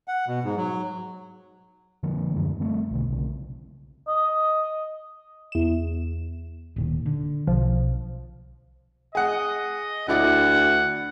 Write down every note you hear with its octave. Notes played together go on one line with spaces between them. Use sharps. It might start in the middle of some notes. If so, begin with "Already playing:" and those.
F#5
B2
G#2
F#3
D3 F3 A#3
F#2 D3 E3 G#3
G3 A3 C4
B1 B2 D3
B1 C#3
D#5
E2 E7
D1 A#2 D#3
D3
B1 F3
G#4 D#5 F#5
D2 E4 D5 F#5